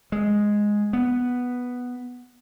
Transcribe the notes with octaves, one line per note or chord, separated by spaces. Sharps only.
G#3
B3